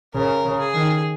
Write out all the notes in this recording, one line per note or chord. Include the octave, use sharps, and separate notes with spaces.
C#3 A#4
C#3
G#4
D#3